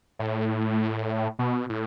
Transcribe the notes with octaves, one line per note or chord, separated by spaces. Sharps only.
A2
B2
A2